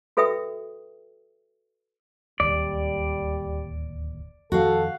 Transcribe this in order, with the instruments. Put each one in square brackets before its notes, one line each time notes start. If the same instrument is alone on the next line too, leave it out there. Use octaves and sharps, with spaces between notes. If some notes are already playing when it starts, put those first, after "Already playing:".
[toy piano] F#4 A4 B4 E5 G5 D#6
[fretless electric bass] D1 G#1 D#2 [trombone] G3 [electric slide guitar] D5
[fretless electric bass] F2 D#3 F3 [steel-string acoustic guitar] F#4 F5 [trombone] A4